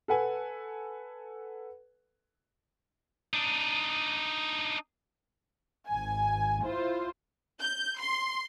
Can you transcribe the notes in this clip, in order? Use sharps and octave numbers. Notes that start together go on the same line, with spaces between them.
A4 B4 F#5 G#5
D4 D#4
G#1 G#5
E4 F4 C5
G6
C6